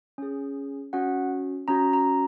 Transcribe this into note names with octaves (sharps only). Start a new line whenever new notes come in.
C#4 G#4
C#4 F#4 F#5
C#4 F#4 A#5
A#5